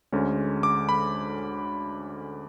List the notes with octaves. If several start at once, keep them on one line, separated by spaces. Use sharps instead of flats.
D2 D3 G#3 C#4
D6
B5